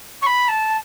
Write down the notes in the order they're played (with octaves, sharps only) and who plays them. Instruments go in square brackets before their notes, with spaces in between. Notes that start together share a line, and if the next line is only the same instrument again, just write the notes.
[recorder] C#6
B5
A5